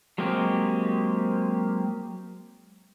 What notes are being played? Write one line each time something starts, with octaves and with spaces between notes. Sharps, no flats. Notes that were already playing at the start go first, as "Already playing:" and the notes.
F#3 G#3 A#3 C4 G4